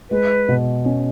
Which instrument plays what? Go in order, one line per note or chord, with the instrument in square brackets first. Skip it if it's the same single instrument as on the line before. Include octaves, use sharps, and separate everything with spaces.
[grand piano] G#3 [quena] B4
[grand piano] B2
C#4